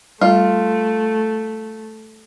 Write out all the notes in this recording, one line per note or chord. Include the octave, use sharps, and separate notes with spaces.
G3 A3 F4